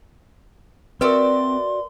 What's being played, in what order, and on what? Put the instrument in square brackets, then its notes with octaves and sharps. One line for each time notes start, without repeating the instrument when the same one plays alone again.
[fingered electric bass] C4 [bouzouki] F#4 D5 E5 [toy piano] A#4 B4 [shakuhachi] C6